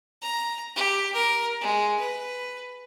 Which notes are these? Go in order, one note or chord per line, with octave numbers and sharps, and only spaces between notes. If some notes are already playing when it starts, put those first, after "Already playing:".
A#5
G4
A#4
G#3
B4